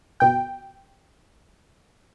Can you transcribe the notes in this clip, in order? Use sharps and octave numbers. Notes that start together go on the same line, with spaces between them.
G1 B2 G5